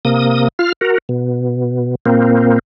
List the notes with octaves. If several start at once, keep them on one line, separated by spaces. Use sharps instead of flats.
C3 A#3 D#6
F4 F6
F#4 A#4
B2
A#2 A#3 C4